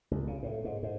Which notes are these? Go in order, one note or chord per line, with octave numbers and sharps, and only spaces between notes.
C#2
C#3
A2
G#2
G#2